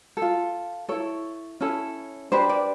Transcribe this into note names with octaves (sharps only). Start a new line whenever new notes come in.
A4
F4
E4 A4 C#5
C#4 E4 A4
D4 G4 B4 C5
D5